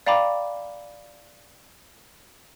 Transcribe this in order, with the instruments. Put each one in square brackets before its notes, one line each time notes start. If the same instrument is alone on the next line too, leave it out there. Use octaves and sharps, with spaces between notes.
[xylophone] D5 F5 G5 A#5 B5 D6